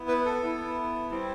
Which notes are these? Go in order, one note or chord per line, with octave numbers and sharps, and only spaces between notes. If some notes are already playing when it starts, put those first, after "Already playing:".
Already playing: B3 E4
B4
A4
B3 E4
G3 C4 E4